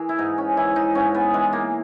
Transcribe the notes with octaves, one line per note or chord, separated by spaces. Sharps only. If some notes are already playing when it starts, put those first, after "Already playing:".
Already playing: E3 G#4 A#4
E4
G#2 D#4
C#4
E3 E4
D#4
G#2 C#4
B3
E3 G#3
A#3